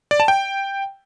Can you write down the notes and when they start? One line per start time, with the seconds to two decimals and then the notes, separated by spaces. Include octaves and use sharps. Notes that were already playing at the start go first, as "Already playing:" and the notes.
0.11 D5
0.20 A5
0.28 G5